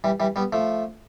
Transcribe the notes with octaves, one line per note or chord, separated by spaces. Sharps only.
E3 G3
E3 G3
G3 B3
F3 A3